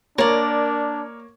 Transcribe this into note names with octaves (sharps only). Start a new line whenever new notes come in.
A#3 D4 A#4 C#5 D5